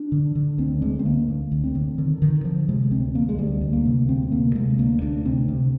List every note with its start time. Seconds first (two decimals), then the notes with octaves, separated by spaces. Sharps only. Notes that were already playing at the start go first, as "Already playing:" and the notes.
Already playing: D4
0.12 D3
0.35 D3
0.58 D2 C4
0.82 D3 G#3
0.99 C4
1.05 D2 A#3
1.28 D3
1.52 D2
1.64 C4
1.75 D3
1.98 D3 D#3
2.22 D3 D#3
2.45 D3 F3
2.69 C3 G#3
2.91 D2 C4
3.14 D2 A#3
3.29 G#3
3.38 D2 G3
3.61 D2
3.73 A#3
3.85 C3
4.08 D2 C4
4.32 C3 A#3
4.55 C3 G#3
4.78 D2 A#3
5.02 D2 D4
5.25 C3 C4
5.48 C3